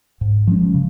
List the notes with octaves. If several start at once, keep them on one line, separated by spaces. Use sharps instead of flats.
G#2
F3 G#3 C#4
C#3